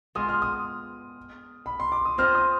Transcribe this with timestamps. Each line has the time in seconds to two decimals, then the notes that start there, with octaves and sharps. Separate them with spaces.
0.15 G#3 B3 F4 D#6
0.29 F6
0.42 D#6
1.66 B5
1.80 C6
1.92 D6
2.05 D#6
2.18 C4 F4 C5 D#5 F6
2.35 D#6